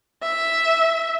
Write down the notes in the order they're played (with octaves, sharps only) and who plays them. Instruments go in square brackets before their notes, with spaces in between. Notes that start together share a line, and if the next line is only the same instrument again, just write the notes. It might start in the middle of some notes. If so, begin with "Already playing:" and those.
[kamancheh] E5